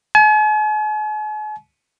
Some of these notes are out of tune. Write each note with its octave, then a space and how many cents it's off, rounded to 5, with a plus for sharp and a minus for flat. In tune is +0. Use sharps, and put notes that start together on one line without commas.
G#5 +45